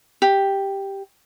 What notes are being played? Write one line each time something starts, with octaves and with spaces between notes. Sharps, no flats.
G4